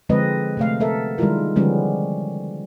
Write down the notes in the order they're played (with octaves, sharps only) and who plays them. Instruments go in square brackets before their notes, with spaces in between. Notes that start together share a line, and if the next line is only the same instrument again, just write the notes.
[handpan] D3 F3 G#3 C4 B4 D#5
C3 A3 F5
B3 A4 A#4 E5
D#3 G3 G#3 E4 F4 A#4
D3 F3 G3 G#3 B3 C#4